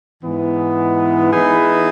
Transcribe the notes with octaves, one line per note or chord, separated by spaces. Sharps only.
G#2 E3 B3
E3 B3 D#4 G#4 B4